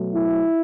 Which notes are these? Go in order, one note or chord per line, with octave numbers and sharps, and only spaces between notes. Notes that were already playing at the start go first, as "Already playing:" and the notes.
Already playing: B2 F#3 A3
E4